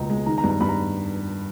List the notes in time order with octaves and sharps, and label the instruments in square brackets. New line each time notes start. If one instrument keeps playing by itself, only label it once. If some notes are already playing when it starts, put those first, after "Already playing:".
Already playing: [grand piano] C#2 B2 A#3 B3 D#5 A#5
G#3
D#3 A#5
A#5
G2
A#5
G2 B5
A#5